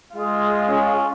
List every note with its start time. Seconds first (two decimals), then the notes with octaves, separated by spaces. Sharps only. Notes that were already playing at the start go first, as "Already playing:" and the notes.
0.16 G#3 F4 G#4
0.68 C#4